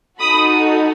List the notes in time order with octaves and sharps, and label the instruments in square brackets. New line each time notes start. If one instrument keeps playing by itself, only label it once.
[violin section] D#4 F#4 A4 B5 D#6